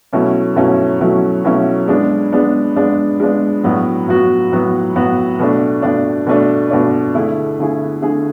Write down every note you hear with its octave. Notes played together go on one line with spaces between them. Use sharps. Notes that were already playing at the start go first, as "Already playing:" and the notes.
B2 F#3 A3 C#4 E4
B2 F#3 A3 C#4 E4
B2 F#3 A3 C#4 E4
B2 F#3 A3 C#4 E4
G#3 B3 D4
G#3 B3 D4
G#3 B3 D4
G#3 B3 D4
A2 F#3 B3 F#4
A2 F#3 B3 F#4
A2 F#3 B3 F#4
A2 F#3 B3 F#4
B2 A3 D4
B2 A3 D4
B2 A3 D4
B2 A3 D4
D3 A3 E4 G#4
D3 A3 E4 G#4
D3 A3 E4 G#4